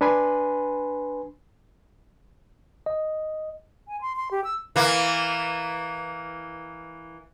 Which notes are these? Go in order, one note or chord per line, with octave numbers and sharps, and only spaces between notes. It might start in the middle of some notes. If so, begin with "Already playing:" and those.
D4 B4 G#5 B5 C6
D#5
G#5
C6
C6
G4
E6
E3 A#3